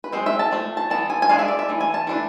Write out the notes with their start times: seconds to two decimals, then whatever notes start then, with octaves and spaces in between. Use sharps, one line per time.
0.04 B4
0.12 G#3 C4 C5
0.26 E5
0.39 A5
0.51 F3 A3
0.77 A5
0.90 E3 B3 A5
1.10 G#5
1.22 G#5
1.29 G#3 D4 F5
1.39 E5
1.48 D5
1.59 E5
1.69 E3 A3
1.81 G#5
1.94 A5
2.07 E3 A3 D4